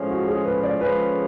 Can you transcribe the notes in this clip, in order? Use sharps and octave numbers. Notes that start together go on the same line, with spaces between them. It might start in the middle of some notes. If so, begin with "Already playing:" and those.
Already playing: A2 F3 G#3 C#4
F#4
G#4
B4
D5
D3 F3 G#3 C#4 G#4 B4